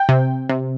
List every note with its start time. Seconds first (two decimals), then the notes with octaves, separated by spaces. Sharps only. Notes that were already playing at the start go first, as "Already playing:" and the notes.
Already playing: G5
0.09 C3
0.49 C3